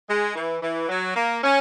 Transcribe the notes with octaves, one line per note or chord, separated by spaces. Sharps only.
G#3
E3
E3
F#3
A#3
C#4